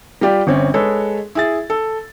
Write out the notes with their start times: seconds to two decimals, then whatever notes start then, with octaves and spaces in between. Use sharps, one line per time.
0.21 G3 F4 G4 D5
0.47 G1 C4 C#4
0.74 G#3 G#4 A4 B4 C#5
1.35 E4 G#4 A6
1.70 A4